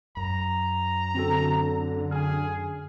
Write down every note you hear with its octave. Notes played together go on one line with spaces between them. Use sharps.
F#2 A#5
D3 C4 F#4 A4
G#4 G#5 F6